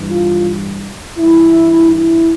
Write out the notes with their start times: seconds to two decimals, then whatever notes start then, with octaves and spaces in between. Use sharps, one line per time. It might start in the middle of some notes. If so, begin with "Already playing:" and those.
Already playing: G2 E3
0.09 F4
1.17 G2 E3 E4
1.90 E4